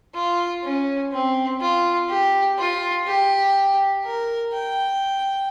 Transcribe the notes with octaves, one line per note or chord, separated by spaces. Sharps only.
F4
C#4
C4
F4
G4
F4
G4
A#4
G5